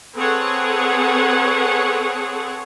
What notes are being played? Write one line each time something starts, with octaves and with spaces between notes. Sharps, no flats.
C4 G#4 A4 B4 C#5 F#5